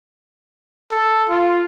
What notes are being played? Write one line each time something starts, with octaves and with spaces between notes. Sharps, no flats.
A4
F4